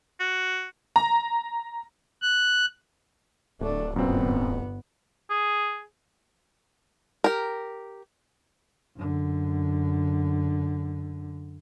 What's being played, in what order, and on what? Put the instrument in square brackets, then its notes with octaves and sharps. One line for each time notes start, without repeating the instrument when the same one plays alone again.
[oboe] F#4
[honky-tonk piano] A#5
[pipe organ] F#6
[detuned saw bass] D1 [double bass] A3 D4
[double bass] G1 B3 [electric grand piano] F#2 A#2 C4
[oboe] G#4
[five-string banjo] G4 A#4
[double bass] F#2 D3